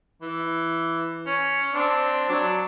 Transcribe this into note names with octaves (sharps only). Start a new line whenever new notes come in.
E3
C#4
C4 D4
F#3 D4